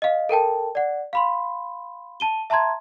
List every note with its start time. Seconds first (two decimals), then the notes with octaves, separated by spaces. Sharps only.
0.02 D#5 F5
0.29 A4 A#4 G5 A5
0.75 D5 F#5
1.13 F5 B5 C6
2.20 A5 D#7 G7
2.50 E5 A5 A#5 C6 G#6